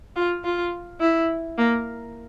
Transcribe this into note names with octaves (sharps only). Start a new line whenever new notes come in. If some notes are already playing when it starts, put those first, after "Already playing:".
F4
F4
E4
A#3